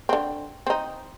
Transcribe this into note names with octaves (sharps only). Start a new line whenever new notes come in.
D3 C4
C4 D#4